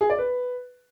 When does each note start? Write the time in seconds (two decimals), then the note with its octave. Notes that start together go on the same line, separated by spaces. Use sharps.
0.01 G#4
0.10 D5
0.19 B4